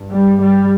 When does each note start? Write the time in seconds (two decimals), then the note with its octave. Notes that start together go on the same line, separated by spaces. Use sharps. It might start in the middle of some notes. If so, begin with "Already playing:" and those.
Already playing: G2
0.11 G3
0.41 G3